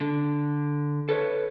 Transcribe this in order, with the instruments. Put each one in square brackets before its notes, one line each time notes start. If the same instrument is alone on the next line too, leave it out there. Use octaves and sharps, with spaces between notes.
[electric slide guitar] D3
A4 B4 C#5